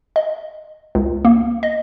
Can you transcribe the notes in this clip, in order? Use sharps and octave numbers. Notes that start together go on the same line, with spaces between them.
D#5
C#2
A#3
D#5